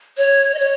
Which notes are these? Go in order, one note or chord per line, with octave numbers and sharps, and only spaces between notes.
C#5
D#5
C#5